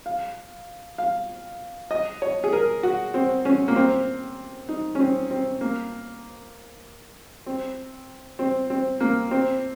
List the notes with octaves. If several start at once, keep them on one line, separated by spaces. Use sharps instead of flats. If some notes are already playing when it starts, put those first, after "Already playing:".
F5
F5
D#5
C#5
G#4
A#4
F#4
C4
C#4
A#3
C4
D#4
C#4
C4
C4
A#3
C4
C4
C4
A#3
C4